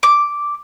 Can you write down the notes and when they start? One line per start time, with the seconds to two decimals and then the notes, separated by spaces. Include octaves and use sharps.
0.03 D6